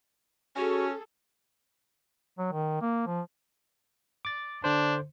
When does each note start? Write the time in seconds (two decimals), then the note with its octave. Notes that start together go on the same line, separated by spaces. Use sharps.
0.56 C#4 F#4 G#4 A4
2.38 F#3
2.52 D#3
2.82 A#3
3.06 F3
4.25 D6 A6
4.64 D3 D4 C5